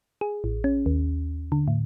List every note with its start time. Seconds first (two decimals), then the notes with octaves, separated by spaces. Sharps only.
0.21 G#4
0.44 A1
0.64 C#4
0.86 D#2
1.52 D3
1.68 A2